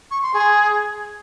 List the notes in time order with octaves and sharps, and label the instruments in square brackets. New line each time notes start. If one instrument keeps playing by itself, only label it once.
[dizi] C#6
C6
G#4